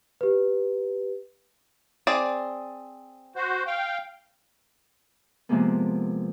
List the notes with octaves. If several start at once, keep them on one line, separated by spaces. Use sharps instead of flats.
G4 B4
C4 G#4 D5
F#4 C5
F5 G5
C3 F3 G#3 A#3 B3